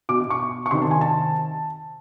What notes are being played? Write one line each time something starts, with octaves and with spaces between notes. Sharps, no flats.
B2 D6
C#6
C#6
C3 D#3 C6
A5
G#5
A5